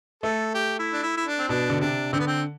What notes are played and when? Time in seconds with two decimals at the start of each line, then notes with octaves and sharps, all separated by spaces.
0.23 A3 A4
0.54 G4
0.79 E4
0.93 D4
1.03 E4
1.17 E4
1.26 D4
1.38 C4
1.49 B2 D4
1.70 D3
1.80 C3 D4
2.13 D3 C4
2.20 B3
2.27 C4